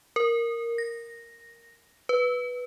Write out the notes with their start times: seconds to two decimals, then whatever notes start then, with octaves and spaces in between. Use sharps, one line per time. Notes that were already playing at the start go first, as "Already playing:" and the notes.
0.16 A#4
0.78 A#6
2.09 B4